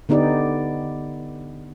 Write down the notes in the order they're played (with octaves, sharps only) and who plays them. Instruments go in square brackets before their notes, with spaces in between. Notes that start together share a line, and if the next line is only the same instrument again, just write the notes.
[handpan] D3 B3 D#4 G4 D5